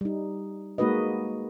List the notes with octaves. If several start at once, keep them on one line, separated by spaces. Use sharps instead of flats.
G3 D#4
G#3 A#3 D#4 F#4 B4 D#5